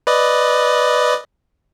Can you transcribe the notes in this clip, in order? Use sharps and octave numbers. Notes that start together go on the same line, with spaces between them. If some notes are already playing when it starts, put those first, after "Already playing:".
B4 D5 D#5